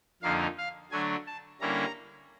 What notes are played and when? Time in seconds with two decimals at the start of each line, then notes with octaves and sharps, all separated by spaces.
0.22 F2 D3 F3 A#3 D#4 F5
0.58 F5
0.91 D3 F#3 A3 D4 G#5
1.27 A5
1.61 D3 G3 A#3 C#4 E4 A#5